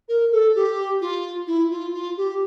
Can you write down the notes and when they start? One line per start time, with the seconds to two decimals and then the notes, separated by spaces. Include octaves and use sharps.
0.09 A#4
0.32 A4
0.55 G4
1.01 F4
1.47 E4
1.71 F4
1.94 F4
2.17 G4